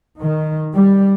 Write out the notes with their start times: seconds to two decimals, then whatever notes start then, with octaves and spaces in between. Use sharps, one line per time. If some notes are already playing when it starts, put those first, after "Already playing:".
0.20 D#3
0.75 G3